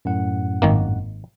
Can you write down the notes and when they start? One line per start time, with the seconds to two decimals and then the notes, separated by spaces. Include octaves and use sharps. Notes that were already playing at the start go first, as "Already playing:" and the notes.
0.05 F#2 A2 F#5
0.62 G#1 D#3 A#3